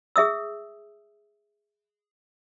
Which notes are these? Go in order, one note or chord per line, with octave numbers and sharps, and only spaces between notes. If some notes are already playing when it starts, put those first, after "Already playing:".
G#4 E5 D#6 E6